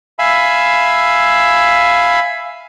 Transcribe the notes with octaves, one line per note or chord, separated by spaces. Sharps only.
E5 F5 G#5 B5 E6